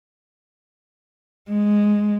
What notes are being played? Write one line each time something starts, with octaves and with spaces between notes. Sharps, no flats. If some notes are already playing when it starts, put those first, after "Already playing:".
G#3